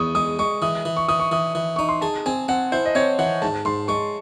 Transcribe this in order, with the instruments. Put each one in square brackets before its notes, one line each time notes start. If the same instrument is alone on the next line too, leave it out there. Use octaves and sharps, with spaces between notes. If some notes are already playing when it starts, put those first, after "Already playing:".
Already playing: [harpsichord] E2 [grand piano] C#6 D#6
[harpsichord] G#3 [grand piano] D#6
[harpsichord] G#3 [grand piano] C#6
[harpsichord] E3 [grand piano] D#6
[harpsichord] E3
[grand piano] C#6
[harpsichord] E3 [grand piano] D#6
[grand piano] C#6
[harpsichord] E3 [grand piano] D#6
[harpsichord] E3
[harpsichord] D#4 [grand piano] C#6
[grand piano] C6
[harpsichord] G#4 [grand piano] A5
[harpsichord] C4 [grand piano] G#5
[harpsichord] C4 [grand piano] F#5
[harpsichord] E4 [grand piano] C5
[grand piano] D#5
[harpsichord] C4 [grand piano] C#5
[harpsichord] E3 [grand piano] F#5
[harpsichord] G#2 [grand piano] A5
[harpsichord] G#2 [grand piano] C6
[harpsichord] G#3 [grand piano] C#6